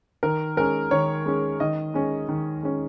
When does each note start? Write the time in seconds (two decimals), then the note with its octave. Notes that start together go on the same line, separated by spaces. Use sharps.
0.23 D#3 A#4
0.57 G#3 C#4 A#4
0.91 D#3 C#5
1.26 G#3 C#4
1.60 D#3 D#5
1.94 G#3 C#4
2.29 D#3
2.63 G#3 C#4